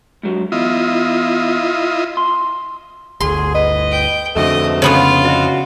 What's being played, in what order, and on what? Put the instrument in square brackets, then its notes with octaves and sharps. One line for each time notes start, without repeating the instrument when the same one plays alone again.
[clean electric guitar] G#2 F#3
[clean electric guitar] E2 [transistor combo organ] E4 F4 D#5
[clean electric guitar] C6
[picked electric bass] G1 D2 [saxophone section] G#4 [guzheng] C6
[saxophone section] B4 D#5
[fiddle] G5
[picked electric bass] F2 D3 [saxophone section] G#2 B2 A3 [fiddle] D#5
[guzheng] C#3 B3 C#4 [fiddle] F4
[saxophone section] E2 B2 F#4